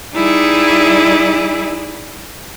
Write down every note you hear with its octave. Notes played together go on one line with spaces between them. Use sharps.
G3 D#4 E4 G#4 D5